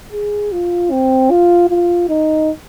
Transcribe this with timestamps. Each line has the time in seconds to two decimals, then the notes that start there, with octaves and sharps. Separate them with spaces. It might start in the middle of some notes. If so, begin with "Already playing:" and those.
0.12 G#4
0.52 F4
0.91 C4
1.30 F4
1.69 F4
2.09 D#4